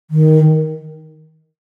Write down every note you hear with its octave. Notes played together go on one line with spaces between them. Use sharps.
D#3